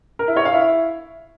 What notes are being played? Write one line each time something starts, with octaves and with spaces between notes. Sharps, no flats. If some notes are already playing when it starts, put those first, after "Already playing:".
A#4
E4
C#5
F5
E4